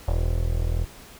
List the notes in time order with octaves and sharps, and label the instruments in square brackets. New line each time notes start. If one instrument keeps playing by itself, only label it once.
[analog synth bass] E1